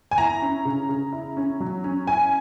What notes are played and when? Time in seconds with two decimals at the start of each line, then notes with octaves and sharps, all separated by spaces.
0.11 G#5
0.18 E4 A#5
0.42 C#4
0.65 C#3
0.89 C#3
1.12 E4
1.37 C#4
1.60 F#3
1.84 C#4
2.07 E4 G#5